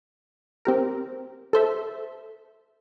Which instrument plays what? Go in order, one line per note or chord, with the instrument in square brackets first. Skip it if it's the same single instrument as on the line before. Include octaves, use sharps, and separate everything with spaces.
[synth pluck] C4 G4 A#4
A4 C5 E5